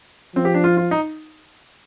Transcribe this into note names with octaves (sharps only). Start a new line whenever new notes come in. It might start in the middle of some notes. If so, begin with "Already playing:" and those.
F3 C4
G4
D4
F4
F4
D#4